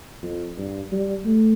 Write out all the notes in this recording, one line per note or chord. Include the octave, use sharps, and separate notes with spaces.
F2
G2
G3
A3